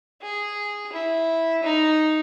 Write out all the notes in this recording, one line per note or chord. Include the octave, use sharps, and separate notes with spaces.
G#4
E4
D#4